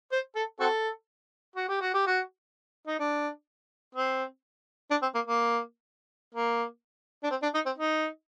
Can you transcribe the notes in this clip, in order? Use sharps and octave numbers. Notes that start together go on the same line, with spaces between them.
C5
A4
C4 F#4 A4
F#4
G4
F#4
G4
F#4
D#4
D4
C4
D4
C4
A#3
A#3
A#3
D4
C4
D4
D#4
C4
D#4